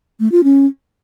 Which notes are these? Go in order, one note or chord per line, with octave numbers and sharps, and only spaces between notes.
A3
F4
C#4